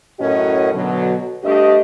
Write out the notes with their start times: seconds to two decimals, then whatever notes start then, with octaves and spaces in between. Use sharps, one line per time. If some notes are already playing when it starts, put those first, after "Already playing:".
0.20 F#2 A2 C#4 F#4 A#4 D#5
0.73 B2 D3 F#3
1.44 G2 A3 D4 G4 D#5